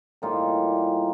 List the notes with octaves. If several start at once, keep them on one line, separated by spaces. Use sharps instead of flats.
A2 E3 G3 A#3 D#4 F4